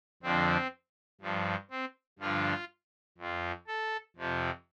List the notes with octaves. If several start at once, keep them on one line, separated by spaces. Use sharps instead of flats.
F2 D3 F3 C4
G2 F3
C4
G2 D3 F3 F4
F2 F3
A4
F2 C3 F3